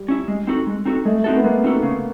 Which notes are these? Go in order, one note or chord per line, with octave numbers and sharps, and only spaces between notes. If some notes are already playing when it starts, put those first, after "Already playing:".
Already playing: G3
C#4 E4
G#3
C4 D#4 F#4 A4
G#3
C4 D#4 F#4 A4
G#3 A3
A3 C4 D#4 F#4 A4
B3
G#3 A#3
C4 D#4 F#4 A4
C#3